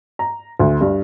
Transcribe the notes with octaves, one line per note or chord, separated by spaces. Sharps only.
A#5
D2
G2